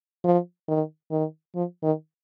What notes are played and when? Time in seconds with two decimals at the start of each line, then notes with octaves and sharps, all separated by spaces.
0.24 F3
0.68 D#3
1.11 D#3
1.55 F3
1.83 D#3